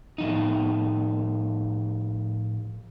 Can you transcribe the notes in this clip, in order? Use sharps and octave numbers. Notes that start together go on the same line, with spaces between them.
A2 F3 D#4